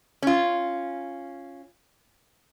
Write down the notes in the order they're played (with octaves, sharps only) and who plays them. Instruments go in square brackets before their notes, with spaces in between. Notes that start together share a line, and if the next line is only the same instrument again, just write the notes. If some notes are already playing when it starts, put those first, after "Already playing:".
[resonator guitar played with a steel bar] C#4 F4